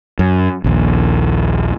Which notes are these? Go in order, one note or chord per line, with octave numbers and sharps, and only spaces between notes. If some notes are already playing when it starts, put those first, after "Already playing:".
F#2
A#1 D#2